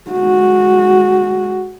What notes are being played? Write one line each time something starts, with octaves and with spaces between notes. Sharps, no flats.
G#3 F#4